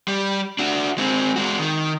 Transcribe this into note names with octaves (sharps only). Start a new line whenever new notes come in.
G3
D4 F#4
G#3 C4
G#3 F#4
D#3